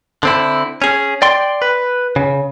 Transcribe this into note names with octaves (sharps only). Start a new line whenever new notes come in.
D3 C4 E4
C#4 G#4
D5 G5 C6
B4
C#3